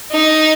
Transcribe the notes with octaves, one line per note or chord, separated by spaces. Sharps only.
D#4